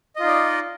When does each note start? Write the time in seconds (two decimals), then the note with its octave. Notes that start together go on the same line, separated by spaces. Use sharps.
0.16 D#5
0.20 F4
0.23 D#4
0.27 D5